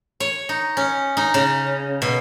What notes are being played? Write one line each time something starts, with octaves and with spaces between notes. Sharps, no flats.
C#5
D#4
C#4
D#4
C#3
B2